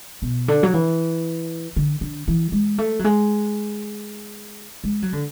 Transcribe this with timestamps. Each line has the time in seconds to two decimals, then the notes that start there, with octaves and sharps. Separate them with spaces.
0.22 B2
0.48 D3
0.63 F#3
0.73 E3
1.76 D3
2.01 D3
2.28 E3
2.52 G#3
2.78 A3
2.99 F#3
3.04 G#3
4.84 G#3
5.02 F#3
5.13 D3